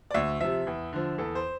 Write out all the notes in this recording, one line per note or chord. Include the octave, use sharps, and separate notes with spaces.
D5
D2 E5
C3 F3 E5
E2
D3 F3
E2 A4
C5